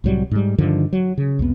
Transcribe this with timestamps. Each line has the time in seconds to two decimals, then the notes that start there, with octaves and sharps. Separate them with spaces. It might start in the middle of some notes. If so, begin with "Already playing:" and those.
0.04 C2 A2 F#3 G3
0.31 G#2 G3
0.58 G2 D3 D#3 F3
0.93 F#3
1.18 C#3
1.39 C2 F2 B3